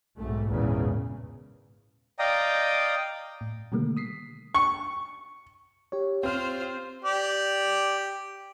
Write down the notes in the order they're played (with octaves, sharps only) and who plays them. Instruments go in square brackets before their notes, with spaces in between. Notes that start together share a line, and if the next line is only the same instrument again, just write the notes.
[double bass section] B1 G#2 A3
G#1 E2 A#2 C#3
[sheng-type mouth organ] D5 D#5 F5 G5 A#5 D#6
[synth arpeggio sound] A2
B2 D3 D#3 G3 A3 A#3
D#6 B6 C7
[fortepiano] C#6
[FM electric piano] G4 C#5
[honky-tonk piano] C4 F6 [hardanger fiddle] F4 C5
[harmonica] G4 D5